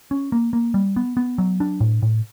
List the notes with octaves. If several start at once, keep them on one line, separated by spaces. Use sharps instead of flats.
C#4
A#3
A#3
G3
B3
B3
F#3
D4
A2
A2